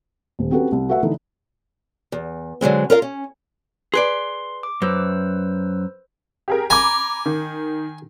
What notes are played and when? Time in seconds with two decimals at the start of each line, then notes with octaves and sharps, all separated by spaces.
0.39 D#1
0.51 C4 C#4 F#4 G4 A4 B4
0.72 C2
0.89 A3 F#4 B4 E5 F#5
1.03 D3 E3 D#4 A4
2.12 E2
2.61 D3 F#3 G#3 C4
2.90 F4 A#4 D5 F5
3.02 C#4
3.94 G#4 B4 D5 C6
4.63 D6
4.82 F#2 B4 C5 E6
6.48 G4 G#4 A#4
6.70 G#5 A#5 B5 D6
7.26 D#3